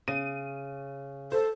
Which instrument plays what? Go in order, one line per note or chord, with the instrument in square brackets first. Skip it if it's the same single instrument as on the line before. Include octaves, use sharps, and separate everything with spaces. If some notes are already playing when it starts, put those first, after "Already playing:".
[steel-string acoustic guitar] C#3 [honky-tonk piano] D#7
[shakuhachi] A4 [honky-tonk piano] C5